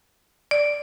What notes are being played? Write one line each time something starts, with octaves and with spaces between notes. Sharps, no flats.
D5